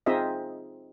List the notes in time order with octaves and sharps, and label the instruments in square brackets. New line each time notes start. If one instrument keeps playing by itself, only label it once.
[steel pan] C4 D#4 F4 G#4 D#5 E5